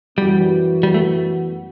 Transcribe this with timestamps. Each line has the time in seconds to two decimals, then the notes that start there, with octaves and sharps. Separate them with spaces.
0.18 F#2 E3 G3 B3 F#4
0.83 G3
0.94 A3